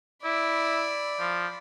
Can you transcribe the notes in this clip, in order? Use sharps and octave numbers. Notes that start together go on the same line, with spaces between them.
E4 D5 B5
F3